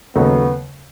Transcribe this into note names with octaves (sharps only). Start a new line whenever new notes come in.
D#2 C#3 F#3 A3 B3 D#4